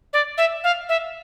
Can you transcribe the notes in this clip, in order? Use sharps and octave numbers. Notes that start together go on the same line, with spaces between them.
D5
E5
F5
E5